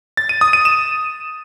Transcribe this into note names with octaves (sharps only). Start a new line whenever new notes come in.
A6
D#7
D#6
D#7
E7